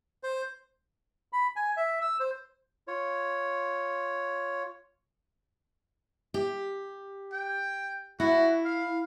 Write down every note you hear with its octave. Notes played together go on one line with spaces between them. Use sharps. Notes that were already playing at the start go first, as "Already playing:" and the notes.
C5
B5
G#5
E5
E6
C5
F4 C#5
G4
G5
E4 F#4
F5